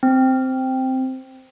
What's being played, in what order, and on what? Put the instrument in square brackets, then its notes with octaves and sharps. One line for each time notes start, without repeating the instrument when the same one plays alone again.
[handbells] C4